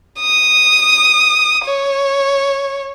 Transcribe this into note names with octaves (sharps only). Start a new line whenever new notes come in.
D#6
C#5